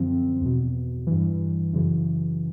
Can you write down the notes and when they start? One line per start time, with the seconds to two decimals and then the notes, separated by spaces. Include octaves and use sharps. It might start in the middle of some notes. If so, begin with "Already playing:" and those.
Already playing: F#2 D3 F3 C4
0.41 E2 B2
1.07 G2 E3
1.73 F#2 C#3 E3